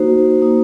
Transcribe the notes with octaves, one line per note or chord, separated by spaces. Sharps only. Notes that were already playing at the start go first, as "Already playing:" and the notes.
Already playing: A#3 D#4 F#4 C5
A#3 D#4 F#4